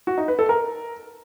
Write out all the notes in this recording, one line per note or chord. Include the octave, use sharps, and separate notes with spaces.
F#4
D#4
B4
A4
A#4